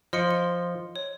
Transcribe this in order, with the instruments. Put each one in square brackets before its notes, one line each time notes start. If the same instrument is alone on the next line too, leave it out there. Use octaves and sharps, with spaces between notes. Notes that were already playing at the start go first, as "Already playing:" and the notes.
[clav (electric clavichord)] F3 [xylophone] D#5 C6 C#7
[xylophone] G7
C#5